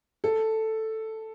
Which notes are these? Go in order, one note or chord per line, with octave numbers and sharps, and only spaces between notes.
A4